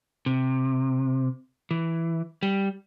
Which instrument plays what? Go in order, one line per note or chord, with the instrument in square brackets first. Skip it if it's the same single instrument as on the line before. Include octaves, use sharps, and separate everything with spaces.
[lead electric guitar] C3
E3
G3